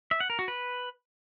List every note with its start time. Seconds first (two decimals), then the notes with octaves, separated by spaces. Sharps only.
0.11 E5
0.20 F#5
0.30 A#4
0.39 F#4
0.48 B4